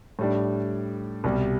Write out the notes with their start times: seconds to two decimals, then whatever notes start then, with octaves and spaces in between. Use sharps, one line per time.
0.19 A2 G3 D4
1.24 C2 B2 G3